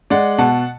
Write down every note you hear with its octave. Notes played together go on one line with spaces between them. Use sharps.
G#3 D5 F#5
B2 F#5 A5